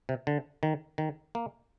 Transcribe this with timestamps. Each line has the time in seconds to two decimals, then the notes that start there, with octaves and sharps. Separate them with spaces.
0.09 C3
0.27 D3
0.63 D#3
0.98 D#3
1.35 A#3